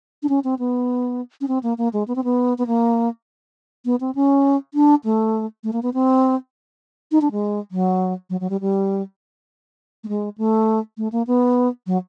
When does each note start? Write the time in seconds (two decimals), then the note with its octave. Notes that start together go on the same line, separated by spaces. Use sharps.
0.23 D4
0.29 C#4
0.44 C4
0.59 B3
1.41 C#4
1.48 C4
1.63 A#3
1.78 A#3
1.93 G#3
2.08 B3
2.16 C4
2.24 B3
2.58 B3
2.67 A#3
3.85 B3
4.00 C4
4.15 C#4
4.74 D4
5.04 A3
5.64 A3
5.73 A#3
5.83 B3
5.94 C4
7.11 D#4
7.21 D4
7.32 G#3
7.71 F#3
8.30 F#3
8.40 F#3
8.50 G3
8.61 G3
10.04 A3
10.08 G#3
10.38 A3
10.98 A3
11.12 A#3
11.27 B3
11.87 F#3